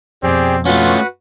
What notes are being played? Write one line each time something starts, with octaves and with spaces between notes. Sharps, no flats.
F2 B2 C4 G4 G#4 D5
A3 C#4 F4 F#4 B4 F#5